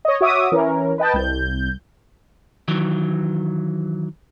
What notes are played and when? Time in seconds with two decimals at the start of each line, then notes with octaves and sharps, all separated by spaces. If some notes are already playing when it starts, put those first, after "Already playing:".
0.05 C#5 D#5
0.21 F#4 C#5 E5 D6 D#6
0.52 E3 C#4 A#4
0.98 B4 D#5 G5 A5
1.14 C2 G6
2.68 D#3 E3 F#3